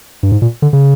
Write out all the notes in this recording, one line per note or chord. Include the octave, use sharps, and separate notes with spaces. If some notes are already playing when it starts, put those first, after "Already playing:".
G2
G#2
A#2
D3
C#3